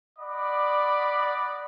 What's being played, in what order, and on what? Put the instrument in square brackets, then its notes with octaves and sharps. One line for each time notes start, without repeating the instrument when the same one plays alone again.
[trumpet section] D5 D#5 F#5 B5 D6